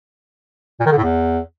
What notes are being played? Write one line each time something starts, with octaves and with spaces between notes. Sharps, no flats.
A#2
D#3
D3
A2
E2